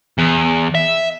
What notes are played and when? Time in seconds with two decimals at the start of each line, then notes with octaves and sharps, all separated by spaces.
0.18 E2
0.75 E5